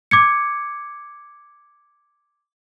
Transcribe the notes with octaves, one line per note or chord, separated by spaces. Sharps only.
D6 G#6 C#7